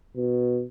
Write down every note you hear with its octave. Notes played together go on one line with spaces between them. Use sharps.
B2